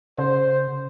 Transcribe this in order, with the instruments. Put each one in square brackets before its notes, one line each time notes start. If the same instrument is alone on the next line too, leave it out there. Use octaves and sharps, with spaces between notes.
[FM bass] C#3 [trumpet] C5